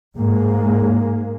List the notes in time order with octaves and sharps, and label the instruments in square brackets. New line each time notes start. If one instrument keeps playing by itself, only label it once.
[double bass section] G#2 G#3 A#3